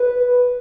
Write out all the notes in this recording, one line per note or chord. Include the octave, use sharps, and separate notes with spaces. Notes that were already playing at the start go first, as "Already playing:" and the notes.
Already playing: B4